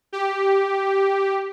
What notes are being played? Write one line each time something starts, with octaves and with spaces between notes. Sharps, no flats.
G4